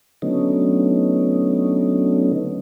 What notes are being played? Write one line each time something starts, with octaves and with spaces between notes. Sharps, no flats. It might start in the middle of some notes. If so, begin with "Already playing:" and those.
D3 F#3 A3 B3 C#4 D#4